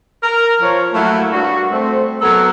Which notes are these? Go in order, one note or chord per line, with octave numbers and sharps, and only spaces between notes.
A#4
F3 C#5
F#3 A3 A#3 E4 E5 F#5
G2 F#4
A3 C4
F#3 B3 A4 A#4